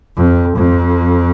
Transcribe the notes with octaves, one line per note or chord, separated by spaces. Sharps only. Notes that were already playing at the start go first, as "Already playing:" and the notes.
F2
F2